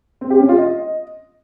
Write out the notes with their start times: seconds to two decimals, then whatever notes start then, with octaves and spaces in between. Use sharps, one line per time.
0.21 C4
0.30 G4
0.40 C#4
0.49 F4
0.58 D#5